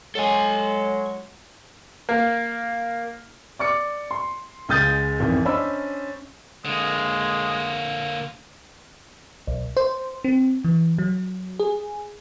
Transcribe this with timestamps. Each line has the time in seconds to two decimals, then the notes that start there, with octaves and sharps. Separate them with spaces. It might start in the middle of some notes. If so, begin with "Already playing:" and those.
0.15 F#3 G#3 A4 G#5
2.09 A#3
3.59 D5 D6 C#7
4.11 C6
4.69 C#2 G#3 D#6 G6 A6
5.20 G#1 F2 E3
5.45 C#4 D4 C5 D#5 B5 E6
6.65 D3 G#3 A#3
9.47 B1
9.77 C5
10.24 C4
10.64 E3
10.98 F#3
11.60 G#4